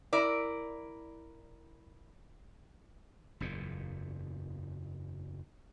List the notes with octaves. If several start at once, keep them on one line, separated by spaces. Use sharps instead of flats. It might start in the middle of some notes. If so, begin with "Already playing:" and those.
E4 A#4 D5
F#1 E2 A#2